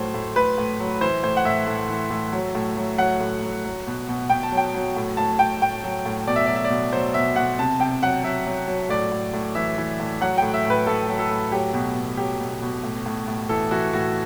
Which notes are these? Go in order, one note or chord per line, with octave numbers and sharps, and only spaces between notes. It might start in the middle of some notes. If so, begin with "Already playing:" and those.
Already playing: A2 F#3 C5
A2
A2 B4
A2
F#3
E3 C5
A2 C5
F#5
A2 E5
A2
E3
A2
F#3
A2
F#3
F#3 F#5
A2
F#3
F#3
B2
B2
B2 G5
A5
F#3
G5
F#3
A2
A2 A5
A2 G5
A2 G5
F#3
A2
B2 D5
E5
F#3 D5
E5
D5
B2
F#3 C5
B2 E5
B2 F#5
C3 A5
C3 G5
F#3 F#5
F#3 E5
F#3
F#3
A2 D5
A2
A2
E3 E5
E3
A2
F#3 F#5
A2 G5
E5
A2 B4
A2 A4
F#3
A4
A2
F#3 G4
B2
B2
F#3 G4
B2
B2
A2
A2
A2
E3 A4
E3 F#4
A2 F#4